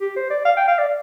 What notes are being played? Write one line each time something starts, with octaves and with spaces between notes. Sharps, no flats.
G4
C5
D5
F5
G5
F5
D5